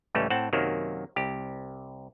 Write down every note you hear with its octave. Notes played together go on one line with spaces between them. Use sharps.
C#2 A2 E3 G3 A3 C#4
A2 C4 F#5 A5
F#2 C3 D#3 F#3 A#3
C2 G4